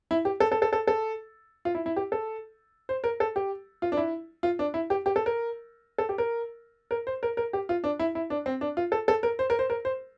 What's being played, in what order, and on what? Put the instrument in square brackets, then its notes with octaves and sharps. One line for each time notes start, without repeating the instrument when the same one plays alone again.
[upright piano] E4
G4
A4
A4
A4
A4
A4
F4
E4
E4
G4
A4
C5
A#4
A4
G4
F4
D4
E4
F4
D4
E4
G4
G4
A4
A#4
A4
G4
A#4
A#4
C5
A#4
A#4
G4
F4
D4
E4
E4
D4
C4
D4
F4
A4
A4
A#4
C5
A#4
C5
A#4
C5